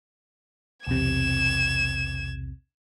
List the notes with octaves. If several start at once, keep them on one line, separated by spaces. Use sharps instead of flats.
B1 E2 C3 G#6 E7